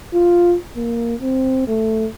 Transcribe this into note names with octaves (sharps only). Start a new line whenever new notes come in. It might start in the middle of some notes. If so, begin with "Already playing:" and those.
F4
A#3
C4
A3